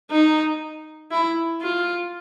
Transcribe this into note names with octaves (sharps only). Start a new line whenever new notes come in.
D#4
E4
F4